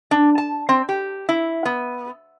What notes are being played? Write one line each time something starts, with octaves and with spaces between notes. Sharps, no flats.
D4
A5
C4
G4
E4
B3